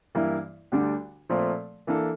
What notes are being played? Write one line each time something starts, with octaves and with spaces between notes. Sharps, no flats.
G2 E3 A#3 E4
D2 D3 G3 D4
A#2 F3 A3 C4
E3 A#3 D4 A4